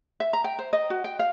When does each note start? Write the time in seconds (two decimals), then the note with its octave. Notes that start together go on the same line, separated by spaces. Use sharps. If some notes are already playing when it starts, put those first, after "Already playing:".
0.20 E5
0.33 A#5
0.44 G5
0.59 C5
0.73 D#5
0.90 F#4
1.04 G5
1.19 F5